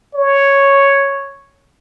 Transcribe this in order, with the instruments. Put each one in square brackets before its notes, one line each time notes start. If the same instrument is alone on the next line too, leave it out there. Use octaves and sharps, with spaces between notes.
[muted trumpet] C#5